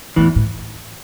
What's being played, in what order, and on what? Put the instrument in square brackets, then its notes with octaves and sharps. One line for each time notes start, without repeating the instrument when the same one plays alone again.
[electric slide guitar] E2 E3 [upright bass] A2
[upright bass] A2